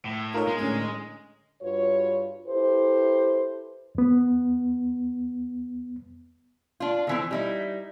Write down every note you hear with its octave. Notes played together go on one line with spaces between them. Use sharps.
A2
D#4 F4 A4 A#4 C#5
A#2 G#3
A2 D3 C#4
G2 F4 F#4 B4 C#5
E4 G4 A4 B4 C5
E2 B3
D4 F4
D3 E3 C4
G3 D#4 E4